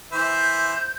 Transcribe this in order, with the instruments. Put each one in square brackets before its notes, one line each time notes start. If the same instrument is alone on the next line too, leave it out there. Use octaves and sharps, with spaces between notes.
[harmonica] E3 C5 E5 [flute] G6